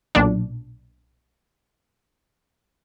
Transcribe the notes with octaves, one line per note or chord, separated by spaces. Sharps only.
B1 A#2 D4